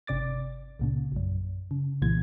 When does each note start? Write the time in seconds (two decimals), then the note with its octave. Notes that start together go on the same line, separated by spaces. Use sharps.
0.07 G1 C3 D5 D6 A6
0.79 C#2 A#2 C#3
1.12 A#1 F#2
1.71 C#3
2.02 C2 A#2 E3 G#6